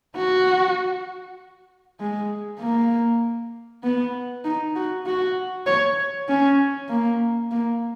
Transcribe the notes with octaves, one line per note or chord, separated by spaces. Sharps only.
F#4
G#3
A#3
B3
D#4
F#4
F#4
C#5
C#4
A#3
A#3